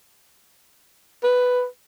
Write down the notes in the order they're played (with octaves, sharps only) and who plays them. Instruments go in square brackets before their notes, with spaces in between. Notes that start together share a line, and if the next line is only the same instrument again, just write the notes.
[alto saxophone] B4